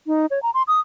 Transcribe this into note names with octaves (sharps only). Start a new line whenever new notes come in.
D#4
C#5
A#5
C6
D#6